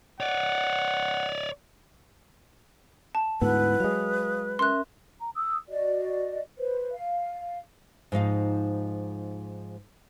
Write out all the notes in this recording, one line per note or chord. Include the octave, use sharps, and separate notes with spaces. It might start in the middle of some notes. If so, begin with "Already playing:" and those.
C#5 D5 F#5
A5
D2 G#2 B3 E4 B4 F#5
F#3 G#3 F5 D#6
C#4 A#4 E5 C6 F#6
A#5
D#6 E6
F#4 D5 D#5
B4 C5
F5
G#2 F3 D#4 F5